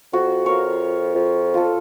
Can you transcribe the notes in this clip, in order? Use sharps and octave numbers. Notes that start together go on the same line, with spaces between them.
F2 F#4
F4 A#4 C#5
F2
F4 A4